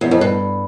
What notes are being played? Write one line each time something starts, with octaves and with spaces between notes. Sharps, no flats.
E2
F2
G2